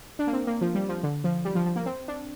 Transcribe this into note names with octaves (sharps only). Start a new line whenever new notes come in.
D4
A#3
C4
A#3
F3
G3
F3
D3
F3
G3
F3
F3
A#3
C4
D4